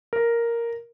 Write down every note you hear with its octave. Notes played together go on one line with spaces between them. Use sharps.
A#4